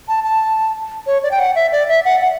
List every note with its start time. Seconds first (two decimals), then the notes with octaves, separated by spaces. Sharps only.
0.08 A5
0.24 A5
1.07 C#5
1.23 D5
1.31 G5
1.40 F#5
1.55 E5
1.72 D5
1.89 E5
2.05 F#5
2.21 F#5